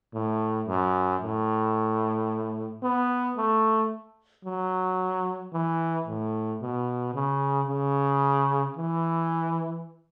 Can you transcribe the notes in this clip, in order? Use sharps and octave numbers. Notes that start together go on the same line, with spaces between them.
A2
F#2
A2
B3
A3
F#3
E3
A2
B2
C#3
C#3
E3